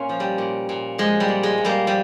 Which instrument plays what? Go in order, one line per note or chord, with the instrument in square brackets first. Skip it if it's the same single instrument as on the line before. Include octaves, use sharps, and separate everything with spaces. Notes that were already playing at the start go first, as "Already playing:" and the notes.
Already playing: [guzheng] A#2 A#3 C#4 F4
F3
G3
A#2
A#2
F3 G#3
G3
A#2
G#3
A#2
G3 A#3
F3 G3